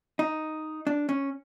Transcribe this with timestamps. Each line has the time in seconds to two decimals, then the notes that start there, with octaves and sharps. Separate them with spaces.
0.19 D#4
0.87 D4
1.09 C#4